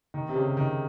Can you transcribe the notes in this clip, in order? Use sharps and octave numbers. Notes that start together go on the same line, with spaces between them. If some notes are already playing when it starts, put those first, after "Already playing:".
D#3
C3
C#3
D#3